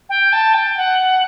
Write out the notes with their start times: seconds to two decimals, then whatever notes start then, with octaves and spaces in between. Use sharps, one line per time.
0.09 G5
0.33 A5
0.54 G5
0.77 F#5